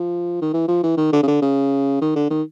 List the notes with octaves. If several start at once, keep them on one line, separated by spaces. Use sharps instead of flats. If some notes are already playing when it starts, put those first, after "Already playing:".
Already playing: F3
D#3
E3
F3
E3
D#3
D3
C#3
D3
C#3
D#3
D3
D#3